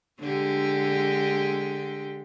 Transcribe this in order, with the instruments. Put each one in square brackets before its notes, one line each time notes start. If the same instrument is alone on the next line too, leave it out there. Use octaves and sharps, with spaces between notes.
[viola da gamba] D3 G#3 G4